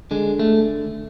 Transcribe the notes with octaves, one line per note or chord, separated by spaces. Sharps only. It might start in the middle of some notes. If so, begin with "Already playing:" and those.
D3 G#3
A3